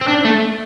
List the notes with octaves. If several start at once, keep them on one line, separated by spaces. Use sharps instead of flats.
C4
D4
A3